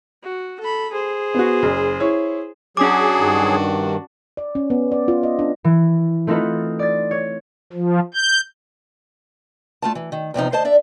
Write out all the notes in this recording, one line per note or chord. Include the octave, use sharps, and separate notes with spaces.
F#4
A4 B5
G#4 C5
B3 F#4
F#1
E4 C#5
F#3 C#4 D4 F#4 G#4 D6
G2 D#3
D5
C#4
B3
D5
F4
D#5
D4
E3
A3 C4 D#4 F4 A4 B4
D5 A6
C#5
F3
G6
A3 F4 A5
E3
D#3
E2 C3 F3 D#4
D2 C5 D#5 A5
D4 D5 E5